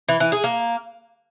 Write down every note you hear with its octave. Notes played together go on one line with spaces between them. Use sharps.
E3
E3
G#4
A#3